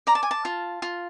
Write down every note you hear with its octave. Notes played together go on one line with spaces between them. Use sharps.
D5 A#5
A5
G#5
A5
F4
F4